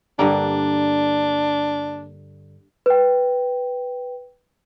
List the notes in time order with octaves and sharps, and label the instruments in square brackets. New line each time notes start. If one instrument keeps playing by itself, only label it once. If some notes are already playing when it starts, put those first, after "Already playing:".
[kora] G2 D3 A#3 [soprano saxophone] D4
[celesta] B4 G5